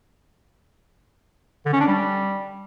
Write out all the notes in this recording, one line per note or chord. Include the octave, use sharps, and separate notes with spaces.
D3
C#4
D4
G3